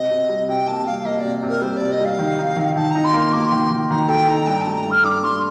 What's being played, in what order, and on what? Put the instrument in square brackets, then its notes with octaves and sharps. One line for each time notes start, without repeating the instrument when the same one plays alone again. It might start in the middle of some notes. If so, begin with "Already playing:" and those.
Already playing: [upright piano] C3 [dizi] D#5
[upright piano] C3
G3
[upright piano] C3 [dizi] G5
[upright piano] A#3 [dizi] A5
[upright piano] G3 [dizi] F5
[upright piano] A#3 [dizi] D#5
[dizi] D5
[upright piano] C3
C3
[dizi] A#4
[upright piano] G3 [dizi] C5
[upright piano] C3 [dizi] D5
[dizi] D#5
[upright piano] G3 [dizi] F5
[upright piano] D#3
D#4
D#3
[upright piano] D#3 [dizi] A5
[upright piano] D#4 [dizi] A#5
[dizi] C6
[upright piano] A#3
[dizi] C6
[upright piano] A#3 [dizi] D6
[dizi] C6
[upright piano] D#3
D#3
[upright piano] D#3 [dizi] A#5
[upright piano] A4 [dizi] G5
[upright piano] D#4 [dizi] A#5
[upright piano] G2 [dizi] G5
[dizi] A5
[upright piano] A3
[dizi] A#5
[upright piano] G2
[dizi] F6
[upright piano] G2 [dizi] D6
[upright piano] G2 [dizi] C6